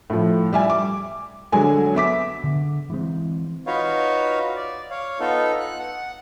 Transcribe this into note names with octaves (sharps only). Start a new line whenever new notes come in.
A2 F3
G3 E5 G#5
D6
D3 F#3 G#3 G#5
B3 E5 D6 B6
D3
E3 G#3 C4
D#4 F4 F#4 B4 C#5 F5
D5
C#5 F5
B3 D#4 F4 A4
F#6
F#5